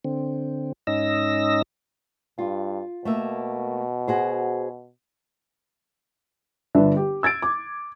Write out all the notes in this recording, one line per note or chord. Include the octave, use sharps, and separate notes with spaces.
D3 C4
G#2 C#4 D#4 D#5 E6 A#6
G2 F4
B2 A3 A#3 E5
F#4 G#4 C5
G1 D3 D4 B4 E5
G4
E6 G#6 A6 D7
D6